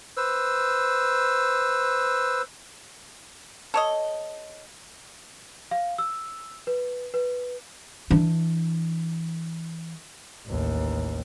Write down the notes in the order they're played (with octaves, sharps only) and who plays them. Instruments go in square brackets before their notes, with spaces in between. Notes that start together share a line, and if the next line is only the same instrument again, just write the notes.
[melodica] B4 C5 E6
[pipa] A4 C#5 D#5
[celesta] F5
E6
B4
B4
[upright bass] E3 D4
[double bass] A1 D#2